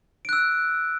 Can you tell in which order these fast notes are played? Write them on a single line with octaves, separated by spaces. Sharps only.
D7 F#6 E6